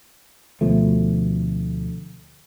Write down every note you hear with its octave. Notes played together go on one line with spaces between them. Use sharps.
D2 B2 F3 A3